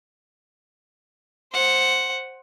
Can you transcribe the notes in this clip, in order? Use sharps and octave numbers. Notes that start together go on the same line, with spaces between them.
C5 F#5